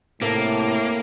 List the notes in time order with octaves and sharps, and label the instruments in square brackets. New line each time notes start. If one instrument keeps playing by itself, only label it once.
[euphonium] A2 [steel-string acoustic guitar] C3 A4 [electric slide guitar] A#3